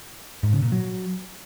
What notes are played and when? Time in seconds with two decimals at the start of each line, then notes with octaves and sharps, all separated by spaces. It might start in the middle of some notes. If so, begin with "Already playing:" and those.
0.43 G#2
0.53 C#3
0.62 A#2
0.72 F#3